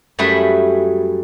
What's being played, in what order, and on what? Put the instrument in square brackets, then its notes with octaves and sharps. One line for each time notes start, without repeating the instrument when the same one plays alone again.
[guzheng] F#2 G3 A3 G#4 B4 E5